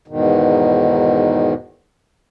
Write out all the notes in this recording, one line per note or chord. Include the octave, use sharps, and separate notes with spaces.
E2 G#2 B2 D#3